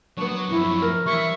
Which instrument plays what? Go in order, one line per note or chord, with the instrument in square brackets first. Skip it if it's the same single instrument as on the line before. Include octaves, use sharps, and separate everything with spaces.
[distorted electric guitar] F#3 [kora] B3 D4 [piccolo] C#6
[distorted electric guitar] F#2 F3 [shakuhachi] E4
[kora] A#4
[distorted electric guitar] E3 B5 [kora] G3 E4 [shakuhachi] E5 [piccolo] C#6